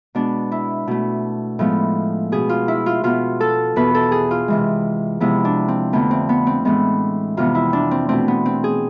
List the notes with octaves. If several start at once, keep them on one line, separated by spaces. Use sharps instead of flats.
B2 G#3 B3 D4
E4
B2 A3
A2 F3 G#3 B3
B2 B3 G#4
F4
E4
F4
B2 B3 F4
A4
E2 B2 B3 B4
A4
G#4
F4
C3 E3 G#3
C3 F3 G#3 B3 E4
D4
C4
F2 D3 A3 B3
C4
B3
C4
A2 E3 G#3 B3
F2 C3 E3 B3 F4
E4
D4
C4
B2 A3 C4
B3
C4
G#4